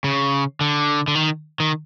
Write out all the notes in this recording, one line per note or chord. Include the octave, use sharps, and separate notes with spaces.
C#3
D3
D3
D#3
D#3